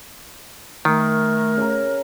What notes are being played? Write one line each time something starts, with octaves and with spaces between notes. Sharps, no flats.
D#3 A3 A#4
C#3 A#5